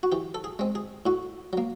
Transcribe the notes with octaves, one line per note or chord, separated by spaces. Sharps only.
F#4
E3 G4
A4
G#4
G#3 C4
G#4
A2 F#4
F#3 A#3